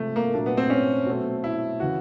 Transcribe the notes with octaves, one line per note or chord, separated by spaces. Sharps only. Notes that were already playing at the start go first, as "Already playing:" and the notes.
Already playing: C3 F3 G#3 A3
A#3
A#2 F#3 A3 D4
B3
C4
C#4
B2 F#3 A3 C4
E4
C#3 E3 F#4